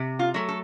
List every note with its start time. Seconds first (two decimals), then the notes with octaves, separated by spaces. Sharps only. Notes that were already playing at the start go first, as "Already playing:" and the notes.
Already playing: C3
0.19 F4
0.34 F#3 A3
0.49 A4